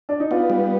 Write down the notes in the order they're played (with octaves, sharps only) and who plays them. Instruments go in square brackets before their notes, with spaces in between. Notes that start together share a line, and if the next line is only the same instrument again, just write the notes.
[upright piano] D4
D#4
[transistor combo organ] B3 [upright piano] F4
[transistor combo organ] G3